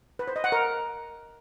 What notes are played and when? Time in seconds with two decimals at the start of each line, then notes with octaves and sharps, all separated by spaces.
0.19 B4
0.28 C5
0.36 D#5
0.44 F#5
0.52 A#4